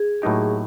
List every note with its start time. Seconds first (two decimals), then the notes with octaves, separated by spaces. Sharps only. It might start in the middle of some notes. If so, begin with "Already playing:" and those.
Already playing: G#4
0.22 A2 F#3 A#3 D#4 G4